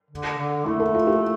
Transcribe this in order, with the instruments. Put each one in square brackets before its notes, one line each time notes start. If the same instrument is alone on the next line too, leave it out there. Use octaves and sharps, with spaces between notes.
[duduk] D3
D3
[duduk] A3 [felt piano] E4
[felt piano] A4
F4
G4